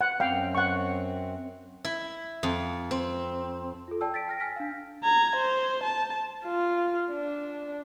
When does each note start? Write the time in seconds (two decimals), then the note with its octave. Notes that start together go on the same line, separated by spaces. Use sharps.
0.01 F#5
0.20 F#2 C4 F5 G5
0.55 F#5 C#6
1.85 E4
2.43 F2
2.91 C4
3.88 F4 A4
4.01 D5 G5 A5 E6
4.14 A6 B6 D7
4.28 G5 F6 A#6
4.40 G#5 F6 B6
4.56 D4 F5
5.03 A#5 G#6
5.36 C5
5.83 A5
6.45 F4
7.12 D4